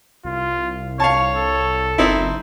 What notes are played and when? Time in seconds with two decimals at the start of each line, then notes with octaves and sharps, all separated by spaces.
0.25 C2 F4
1.00 C#5 F5 A5 C#6
1.36 A4
1.98 F#1 C4 D#4 E4